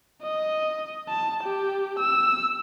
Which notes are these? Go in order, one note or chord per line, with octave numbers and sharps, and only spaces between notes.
D#5
A5
G4
E6